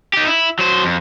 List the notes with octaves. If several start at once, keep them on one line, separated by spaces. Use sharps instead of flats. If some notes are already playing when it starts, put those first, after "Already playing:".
D#4 G4
E4
F#3 C5
F2